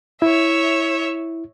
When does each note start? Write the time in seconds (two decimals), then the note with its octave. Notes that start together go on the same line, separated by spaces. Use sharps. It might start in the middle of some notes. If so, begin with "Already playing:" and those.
0.22 E4 C#5 E5